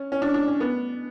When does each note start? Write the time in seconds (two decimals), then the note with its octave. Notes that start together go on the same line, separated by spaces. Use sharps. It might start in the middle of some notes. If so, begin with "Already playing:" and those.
Already playing: C#4
0.12 C#4
0.22 D4
0.34 D4
0.48 C#4
0.60 B3